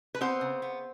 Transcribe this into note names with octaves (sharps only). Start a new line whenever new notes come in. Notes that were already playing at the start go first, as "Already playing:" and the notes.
B4
B3 C4 C5
C#3
B3